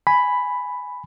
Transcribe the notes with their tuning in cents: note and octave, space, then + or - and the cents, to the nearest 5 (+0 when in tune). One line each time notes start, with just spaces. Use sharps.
G#5 +0 B5 +5